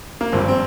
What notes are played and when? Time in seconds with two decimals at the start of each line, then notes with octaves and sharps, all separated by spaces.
0.21 A#3
0.32 G#1 G2 F3 C4
0.48 C4